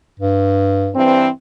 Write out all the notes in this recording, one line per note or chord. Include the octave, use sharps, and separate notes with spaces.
G2
G2 E3 C4